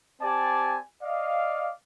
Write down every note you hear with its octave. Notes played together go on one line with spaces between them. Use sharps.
C4 G4 D5 G#5 A5
D5 D#5 F5